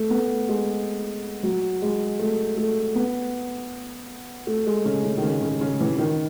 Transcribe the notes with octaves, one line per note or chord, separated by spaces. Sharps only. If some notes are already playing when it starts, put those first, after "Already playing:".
Already playing: A3
B3
G#3
F#3
G#3
A3
A3
B3
A3
G#3
C#3
C#3
D#3
C#3
C#3
C#3
E3
D#3